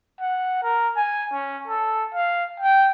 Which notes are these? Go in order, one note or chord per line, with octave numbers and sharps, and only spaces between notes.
F#5
A#4
G#5
C#4
A4
F5
G5